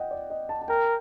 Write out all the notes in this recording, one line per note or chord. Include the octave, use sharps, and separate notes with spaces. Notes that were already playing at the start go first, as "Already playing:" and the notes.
Already playing: D#5 F#5 G5
D5
D#5
A5
A5
A#4 G5